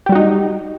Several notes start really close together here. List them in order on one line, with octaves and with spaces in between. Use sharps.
G4 G3 F#4 D#4